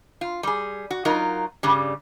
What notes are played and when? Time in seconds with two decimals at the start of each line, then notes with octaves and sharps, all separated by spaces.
0.21 F4
0.43 G3 G#4
0.91 F#4
1.05 F#3 D#4 F4 A#4
1.63 G2 C#3 G3